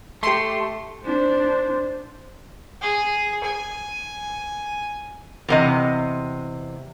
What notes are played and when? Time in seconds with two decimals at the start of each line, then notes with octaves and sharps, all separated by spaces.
0.23 A3 G4 C6
1.05 D4 C5
2.82 G#4
3.44 G#5
5.48 E2 C3 D#5